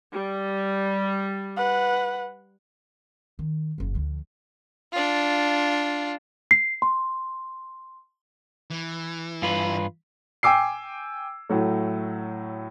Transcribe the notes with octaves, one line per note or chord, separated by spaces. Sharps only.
G3
B4 F#5
D#3
F#1 F#2
D2 F3
D4 F4
C7
C6
E3
G2 F4 B4
G5 G#5 D6 E6 C7
A2 F#3 A3